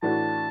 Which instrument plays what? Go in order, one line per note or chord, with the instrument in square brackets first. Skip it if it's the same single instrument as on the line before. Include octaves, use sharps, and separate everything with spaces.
[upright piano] A2 E3 A3 D4 F#4 [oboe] A5